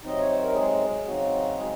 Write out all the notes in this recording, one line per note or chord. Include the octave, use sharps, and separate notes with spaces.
C3 F#3 C4 D#4 D#5
C#5
C5
A#4
G#3 G#4
C#3 F#3 C4 D#4 F#4
G#3 G#4